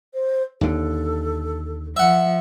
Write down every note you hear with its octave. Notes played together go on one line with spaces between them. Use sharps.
C5
D#2 D3 A4
F3 E5 F#5